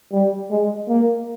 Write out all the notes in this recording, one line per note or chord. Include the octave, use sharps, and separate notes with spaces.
G3
G#3
A#3